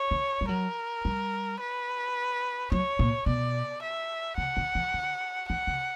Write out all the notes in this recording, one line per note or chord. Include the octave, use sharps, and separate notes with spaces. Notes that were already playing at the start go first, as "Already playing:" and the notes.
Already playing: C#5
D3
G3
F#3 A#4
G3
B4
F#3 C#5
A#2
B2 D5
E5
C#3 F#5
D3
E3
D3
E3 F#5
C#3